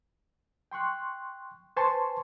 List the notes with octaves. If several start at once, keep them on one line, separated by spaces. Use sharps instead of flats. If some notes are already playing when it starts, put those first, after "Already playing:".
G5 C6 C#6 F#6
B4 C5 G#5 A5 C6 C#6